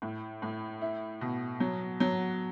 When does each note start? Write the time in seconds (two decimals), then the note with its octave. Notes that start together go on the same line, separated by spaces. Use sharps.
0.02 A2
0.42 A2
0.81 E4
1.21 B2
1.60 F#3
2.00 F#3